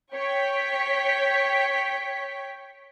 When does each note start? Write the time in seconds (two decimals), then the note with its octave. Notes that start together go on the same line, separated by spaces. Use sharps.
0.13 C#5 G5 B6